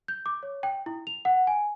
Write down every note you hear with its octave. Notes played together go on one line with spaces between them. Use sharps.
G6
D6
C#5
G5
E4
F7
F#5
G#5